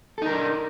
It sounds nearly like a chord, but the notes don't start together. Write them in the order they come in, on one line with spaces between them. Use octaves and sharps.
A4 D#4 A#4 D4